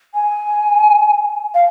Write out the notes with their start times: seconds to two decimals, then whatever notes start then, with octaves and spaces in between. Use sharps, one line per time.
0.14 G#5
1.54 F5